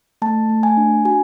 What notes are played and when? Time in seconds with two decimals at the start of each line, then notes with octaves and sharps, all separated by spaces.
0.22 A3 A5
0.49 A3
0.63 G#5
0.77 D4
1.05 F#4 G#5